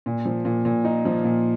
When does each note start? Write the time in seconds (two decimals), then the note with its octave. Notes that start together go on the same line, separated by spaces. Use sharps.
0.06 A#2
0.25 F3
0.45 A#2
0.65 A#2
0.85 D#4
1.05 F3
1.24 A#2